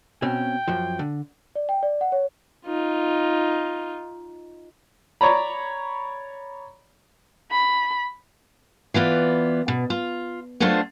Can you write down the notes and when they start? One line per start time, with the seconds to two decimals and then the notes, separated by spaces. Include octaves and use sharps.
0.22 B2 C4 C#4 G5
0.68 F#2 F3
0.99 D3
1.55 D5
1.69 G5
1.83 D5
2.01 F#5
2.12 C#5
2.65 D#4 F4
5.21 C#5 D5 A#5 B5
7.51 B5
8.94 E3 B3 F4 D5
9.68 B2
9.90 F4
10.60 F#3 A3 B3 D4 F4 C5